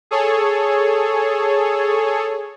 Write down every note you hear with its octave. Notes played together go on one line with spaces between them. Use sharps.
G#4 A4 C#5